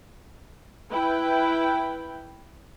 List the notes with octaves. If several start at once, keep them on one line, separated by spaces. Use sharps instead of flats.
E4 B4 G5